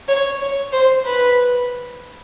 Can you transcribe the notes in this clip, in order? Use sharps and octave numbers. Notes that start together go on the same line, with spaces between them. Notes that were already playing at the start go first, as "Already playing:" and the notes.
C#5
C#5
C5
B4